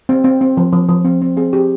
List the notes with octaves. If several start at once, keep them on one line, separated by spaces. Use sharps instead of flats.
C4
C4
C4
F3
F3
F3
C4
C4
C4 G#4
C4 G4